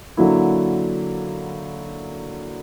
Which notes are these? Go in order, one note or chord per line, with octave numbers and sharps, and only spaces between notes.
D3 F#3 A#3 E4